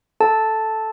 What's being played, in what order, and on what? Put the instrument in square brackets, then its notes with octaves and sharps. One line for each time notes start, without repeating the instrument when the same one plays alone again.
[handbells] A4 A5